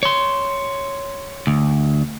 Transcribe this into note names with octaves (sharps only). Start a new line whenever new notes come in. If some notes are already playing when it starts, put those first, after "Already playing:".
C#5 C6
D2